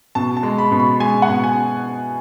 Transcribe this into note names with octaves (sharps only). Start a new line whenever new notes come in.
B2 A5
A5
G#3
B5
B2
B5
G#3 G#5
F#5
B2
G#5